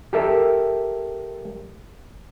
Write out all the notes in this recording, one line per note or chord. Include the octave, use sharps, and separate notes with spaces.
G4 A4 A#4 E5